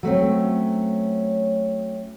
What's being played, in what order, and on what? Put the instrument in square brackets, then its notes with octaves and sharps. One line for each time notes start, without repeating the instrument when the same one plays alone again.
[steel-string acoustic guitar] F#3 A3 C4 C#4